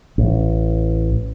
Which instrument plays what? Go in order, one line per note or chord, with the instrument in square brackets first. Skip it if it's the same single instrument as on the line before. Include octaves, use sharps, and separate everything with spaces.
[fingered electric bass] A1